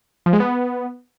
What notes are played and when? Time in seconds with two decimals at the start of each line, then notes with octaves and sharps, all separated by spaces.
0.26 F3
0.33 G#3
0.40 B3